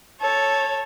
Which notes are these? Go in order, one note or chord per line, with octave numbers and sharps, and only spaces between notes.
A4 C#5